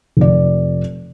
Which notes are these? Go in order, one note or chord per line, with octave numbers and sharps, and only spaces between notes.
F1 D5